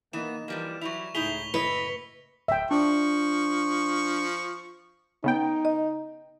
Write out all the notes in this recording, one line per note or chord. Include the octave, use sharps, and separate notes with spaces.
E3 A#3 B3 D#4 E7
E3 F3 G3 A#3
F#3 G3 E4 C#6 F7
C#2 A2 D#4 E4 G#4 B6 F7 G7
F#1 E4 B4 D#5 C#7
D1 E5 G5
F3 D4 C#6
C#3 B3 D#4 G5
D#5